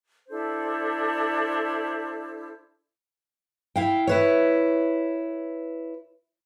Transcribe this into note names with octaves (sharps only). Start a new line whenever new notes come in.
D4 E4 A4 C5
E4 F5 G5
E4 B4 C#5